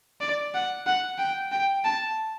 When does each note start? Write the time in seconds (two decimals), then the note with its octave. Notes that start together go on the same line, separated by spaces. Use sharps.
0.21 D5
0.54 F#5
0.86 F#5
1.18 G5
1.52 G5
1.84 A5